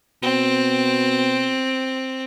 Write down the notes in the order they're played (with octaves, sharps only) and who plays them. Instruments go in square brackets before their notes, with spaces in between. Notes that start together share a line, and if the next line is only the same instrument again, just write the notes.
[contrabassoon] B2 [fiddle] C4